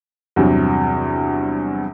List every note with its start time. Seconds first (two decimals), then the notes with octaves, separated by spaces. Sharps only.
0.36 E2 G2 C3 F#3